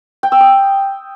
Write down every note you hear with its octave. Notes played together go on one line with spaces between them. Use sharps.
G5
E6
D#6